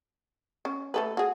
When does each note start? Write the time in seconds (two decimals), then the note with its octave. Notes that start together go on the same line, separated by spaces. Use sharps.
0.65 C#4
0.94 A3 A4 B4
1.17 F#4 G#4